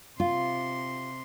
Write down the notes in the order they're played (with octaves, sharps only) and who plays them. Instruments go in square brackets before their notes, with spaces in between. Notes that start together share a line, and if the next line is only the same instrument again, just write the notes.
[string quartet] C3 C6 [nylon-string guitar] F4